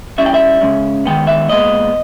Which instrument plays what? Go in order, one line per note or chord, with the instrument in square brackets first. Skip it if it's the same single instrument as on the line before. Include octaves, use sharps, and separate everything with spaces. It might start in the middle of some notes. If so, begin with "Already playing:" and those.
[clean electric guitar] G3 C#4 E4 E5
G5
E5
C#3 G#3 C#4
D#3 G#3 B3 G5
E5
A#2 G#3 B3 D#5